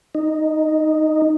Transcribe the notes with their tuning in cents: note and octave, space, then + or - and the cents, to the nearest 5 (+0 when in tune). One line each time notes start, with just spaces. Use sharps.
D#4 -5